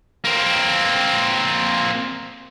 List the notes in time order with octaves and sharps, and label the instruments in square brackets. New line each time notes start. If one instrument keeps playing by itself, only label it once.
[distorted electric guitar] A#3 C4